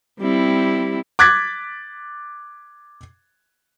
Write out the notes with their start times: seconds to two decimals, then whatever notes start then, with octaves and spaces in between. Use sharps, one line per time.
0.20 G3 C4 E4
1.19 D6 F#6 G#6 A6 B6